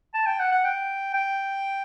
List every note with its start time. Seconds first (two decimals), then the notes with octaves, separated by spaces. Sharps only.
0.14 A5
0.26 G5
0.40 F#5
0.52 F#5
0.65 G5
1.14 G5